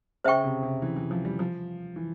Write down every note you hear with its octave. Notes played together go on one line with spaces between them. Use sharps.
C#3 C5 E5 G5 C#6
C3
C3
E3
E3
F3
G3
F3
E3